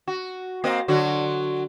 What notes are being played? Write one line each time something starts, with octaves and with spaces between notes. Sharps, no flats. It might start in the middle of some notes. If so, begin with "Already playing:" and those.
F#4
A#3 C4 D#5
D3 F#3 F#4